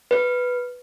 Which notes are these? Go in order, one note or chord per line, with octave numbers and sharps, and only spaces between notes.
B4